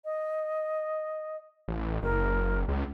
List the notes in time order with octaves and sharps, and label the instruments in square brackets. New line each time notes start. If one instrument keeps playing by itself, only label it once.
[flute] D#5
[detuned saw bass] A1
[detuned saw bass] F#1 [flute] A#4
[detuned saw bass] C#2